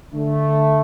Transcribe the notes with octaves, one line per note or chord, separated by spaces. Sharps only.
D3 A3